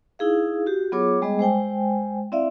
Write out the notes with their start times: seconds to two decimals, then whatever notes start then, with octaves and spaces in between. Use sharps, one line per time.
0.19 D#4 E4 G#4 F5
0.66 F#4 G4
0.92 F#3 B3 F4 G#4 C#5 D6
1.22 G3 G#3 B3 G#4 D#5
1.39 G#3 C5 G5 G#5
2.32 C4 E4 D5 E5 F5